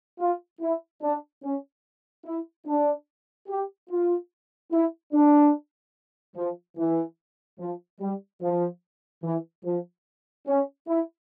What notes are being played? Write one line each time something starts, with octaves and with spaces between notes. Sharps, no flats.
F4
E4
D4
C#4
E4
D4
G4
F4
E4
D4
F3
E3
F3
G3
F3
E3
F3
C#4
E4